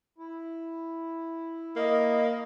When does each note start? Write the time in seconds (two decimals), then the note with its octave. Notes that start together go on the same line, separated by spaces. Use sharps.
0.18 E4
1.76 A#3 D#5